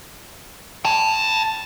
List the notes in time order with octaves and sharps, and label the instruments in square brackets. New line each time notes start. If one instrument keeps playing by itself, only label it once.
[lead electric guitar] G5 A5